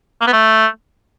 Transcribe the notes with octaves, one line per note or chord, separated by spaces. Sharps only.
A#3
B3
A3